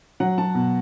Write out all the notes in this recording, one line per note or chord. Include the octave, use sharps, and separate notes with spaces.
F#3 F#5
F#3 A5
B2